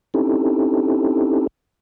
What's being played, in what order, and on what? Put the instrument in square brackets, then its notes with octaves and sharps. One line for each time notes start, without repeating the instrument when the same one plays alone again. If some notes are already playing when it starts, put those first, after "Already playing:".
[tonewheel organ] C4 C#4 D#4 E4 G4 A4